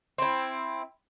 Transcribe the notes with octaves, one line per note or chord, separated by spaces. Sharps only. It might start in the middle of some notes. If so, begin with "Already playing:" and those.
C4 E4